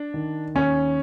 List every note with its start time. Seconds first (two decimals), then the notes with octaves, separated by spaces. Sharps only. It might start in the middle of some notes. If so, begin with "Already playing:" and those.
Already playing: D4
0.14 D#3
0.55 D#2 C#4